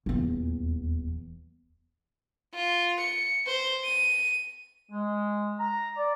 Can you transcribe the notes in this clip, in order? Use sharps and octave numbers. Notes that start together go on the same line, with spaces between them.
D#1 E2
F4
C#7
C5
D#7
G#3
A#5
D5